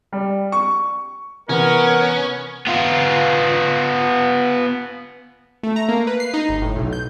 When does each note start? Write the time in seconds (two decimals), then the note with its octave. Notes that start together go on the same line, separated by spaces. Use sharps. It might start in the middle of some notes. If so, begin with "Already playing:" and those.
0.13 G3
0.52 C#6
1.49 C3 E3 B3 C#4 A#4
2.67 B3 F4
5.63 A3
5.76 A#5
5.89 A#3
6.07 B4
6.20 C7
6.34 D#4
6.49 G1
6.62 A2
6.76 B1
6.93 G6